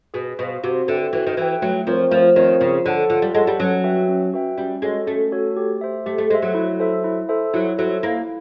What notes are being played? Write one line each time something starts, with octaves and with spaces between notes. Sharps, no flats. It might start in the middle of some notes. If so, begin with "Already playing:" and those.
B2 G#4
B2 C5 F5
C3 F#4
D3 B4 E5 G5
E3 F#4
D#3
E3 B4 E5 G5
F#3 A3
F3 C4 F4 A#4 C#5
F3 A3
D#3 C4 F4 A#4 C#5
C#3 F4
D3 A4 C#5 F#5 A5
D3 F4
G3
G#3 A4 C#5 F#5 A5
G3
F#3 C#4
F#4 B4 E5 G5
C#4
F#4 B4 E5 G5
G3 C#4
G#3 F#4 A4 C#5
A3 C#4
F#4 A4 C#5
G4
C5 E5
A3 G4
A3
G#3 C5 E5
F#3
E4
A4 C5 E5
E4
A4 C5 E5
F#3 E4
F#3 A4 C5 E5
A#3 E4